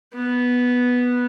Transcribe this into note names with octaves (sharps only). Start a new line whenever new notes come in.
B3